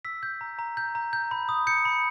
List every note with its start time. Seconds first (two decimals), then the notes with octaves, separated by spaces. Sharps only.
0.05 E6 B6
0.23 G6
0.41 A#5
0.59 A#5
0.77 G6
0.95 A#5
1.13 G6
1.31 B5
1.49 D#6
1.67 G6 C#7
1.85 B5